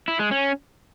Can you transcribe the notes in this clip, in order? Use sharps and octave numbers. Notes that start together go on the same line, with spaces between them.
E4
G#3
C#4